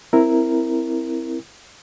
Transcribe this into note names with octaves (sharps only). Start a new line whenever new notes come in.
C4 E4 A#4